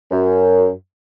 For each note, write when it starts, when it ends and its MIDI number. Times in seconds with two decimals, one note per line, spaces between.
0.10 0.70 42